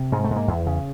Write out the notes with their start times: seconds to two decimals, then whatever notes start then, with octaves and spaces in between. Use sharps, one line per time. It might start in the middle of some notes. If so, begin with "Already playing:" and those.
Already playing: C3
0.12 G#2 G#3
0.24 A3
0.31 G#2
0.36 A#3
0.48 E2
0.66 C#3